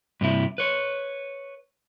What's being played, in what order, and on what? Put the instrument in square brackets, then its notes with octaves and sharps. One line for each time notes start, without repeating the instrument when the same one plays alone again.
[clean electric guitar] G2 C3 E4
B4 C#5